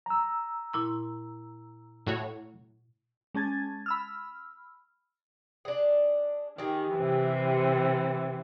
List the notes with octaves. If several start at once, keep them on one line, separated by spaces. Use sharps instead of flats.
A#5 E6
A#2 E4 C6
A2 F#4 C#5
G#3 C#4 A5 G#6 A6
B5 E6 F6
D4 G#4
D#3 G4 G#4
C3 E3